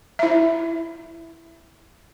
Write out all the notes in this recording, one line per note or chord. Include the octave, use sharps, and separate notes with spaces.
E4 E5